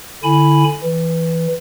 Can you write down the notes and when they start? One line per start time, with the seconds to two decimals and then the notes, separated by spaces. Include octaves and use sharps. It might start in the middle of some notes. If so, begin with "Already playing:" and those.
0.24 D3 E4 G#5 B5
0.83 E3